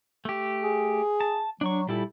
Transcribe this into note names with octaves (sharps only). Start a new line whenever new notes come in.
A3 G4
G#4
A5
F#3 D4 C#6
A#2 G3 E4 A4